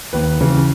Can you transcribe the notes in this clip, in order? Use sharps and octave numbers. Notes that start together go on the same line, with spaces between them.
D#2 B4
C#3 E3